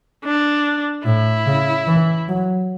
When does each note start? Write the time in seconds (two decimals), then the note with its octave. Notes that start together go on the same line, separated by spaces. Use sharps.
0.25 D4
1.05 A2 E4
1.46 C#3
1.87 E3
2.28 F#3